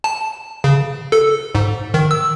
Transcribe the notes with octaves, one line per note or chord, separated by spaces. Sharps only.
A5
C#3
A4
G#2
D#3
E6